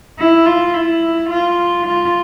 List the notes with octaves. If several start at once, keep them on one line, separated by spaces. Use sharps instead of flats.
E4
F4
E4
F4
F4